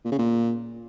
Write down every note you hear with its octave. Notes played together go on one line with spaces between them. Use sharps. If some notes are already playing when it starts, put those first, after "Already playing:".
A#2
C#3
A#2